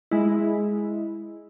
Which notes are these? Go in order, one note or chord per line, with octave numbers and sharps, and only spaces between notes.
G#3 E4